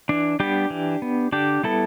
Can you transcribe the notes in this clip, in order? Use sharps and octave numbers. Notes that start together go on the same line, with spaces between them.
E3 D4
G3 B3 D4 G4
E3
B3
D3 D4 G4
G3 B3 E4 A4